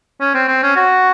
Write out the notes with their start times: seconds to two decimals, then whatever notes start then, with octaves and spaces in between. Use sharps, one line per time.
0.21 C#4
0.35 C4
0.48 C4
0.63 C#4
0.76 F#4